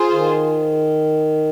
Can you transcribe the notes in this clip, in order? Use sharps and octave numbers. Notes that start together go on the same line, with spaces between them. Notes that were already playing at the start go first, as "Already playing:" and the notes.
Already playing: F4 G#4 C5
D#3